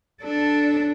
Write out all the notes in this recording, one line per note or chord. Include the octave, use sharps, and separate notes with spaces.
D4 A4